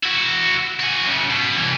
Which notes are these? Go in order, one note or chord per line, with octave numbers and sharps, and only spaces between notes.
E4 F#4
F#4 G#4
F#2 C#3
B2
C2 E3